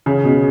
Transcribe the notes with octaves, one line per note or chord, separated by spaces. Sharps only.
C#3
B2